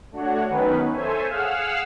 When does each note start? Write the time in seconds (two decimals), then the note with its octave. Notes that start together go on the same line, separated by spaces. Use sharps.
0.11 A3 D4 F#4 C#5 F#5
0.50 D#3 F#3 B3 C#4 D#4 B4
0.91 A4 C5 C#5 E5 G#5
1.27 G#4 F5 F#5 E6 F6